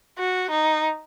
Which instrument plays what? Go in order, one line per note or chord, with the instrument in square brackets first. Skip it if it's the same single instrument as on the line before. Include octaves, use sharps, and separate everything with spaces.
[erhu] F#4
D#4